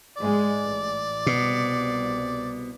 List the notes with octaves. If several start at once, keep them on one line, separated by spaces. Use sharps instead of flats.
G#2 G#3 D5
A1
C2 B2